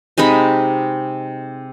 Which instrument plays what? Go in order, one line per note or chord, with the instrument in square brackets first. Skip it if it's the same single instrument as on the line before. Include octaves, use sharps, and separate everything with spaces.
[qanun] C3 G#3 D#4 B5